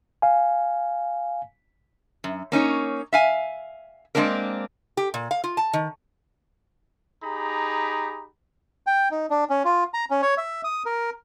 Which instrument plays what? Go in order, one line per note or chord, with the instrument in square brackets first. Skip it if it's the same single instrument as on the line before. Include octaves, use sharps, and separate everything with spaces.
[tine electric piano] F5 G#5
[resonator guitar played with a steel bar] F#2
A#3 C#4 D#4 C#5
E5 F5 G#5
G#3 A#3 C4 D4 A#4
G4
A#2
F5
F4
A5
D#3
[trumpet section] D#4 G4 G#4 A#5 B5
[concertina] G5
D#4
D4
C#4
F4
A#5
C#4
C#5
E5
D#6
A#4